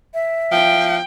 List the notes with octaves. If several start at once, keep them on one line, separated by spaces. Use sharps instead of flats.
E5
F3 G5